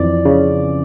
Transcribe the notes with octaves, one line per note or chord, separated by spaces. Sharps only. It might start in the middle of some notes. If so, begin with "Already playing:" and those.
Already playing: F2 E3 D5
C#3